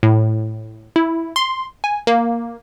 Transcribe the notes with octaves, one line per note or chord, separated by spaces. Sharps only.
A2
E4
C6
G#5
A#3